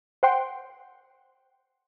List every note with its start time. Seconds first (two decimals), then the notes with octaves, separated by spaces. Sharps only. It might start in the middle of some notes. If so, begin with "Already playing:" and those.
0.23 C5 F#5 G5 C6